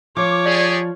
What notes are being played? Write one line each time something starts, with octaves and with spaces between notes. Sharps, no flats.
F3 C#5 D6
G4 G#4 D5